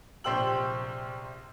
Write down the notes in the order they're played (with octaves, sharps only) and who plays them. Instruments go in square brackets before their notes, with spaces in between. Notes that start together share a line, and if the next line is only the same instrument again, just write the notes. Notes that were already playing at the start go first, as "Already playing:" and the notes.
[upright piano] A#1 C3 C5 G5 E6 F#7